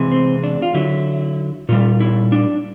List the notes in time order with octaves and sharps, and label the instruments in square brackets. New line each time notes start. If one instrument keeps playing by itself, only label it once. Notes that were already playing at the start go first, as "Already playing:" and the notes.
Already playing: [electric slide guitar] C3 E3 G#3
C4
D4
F4
D3 F#3 E4
A#2 G3 F4
E4
D4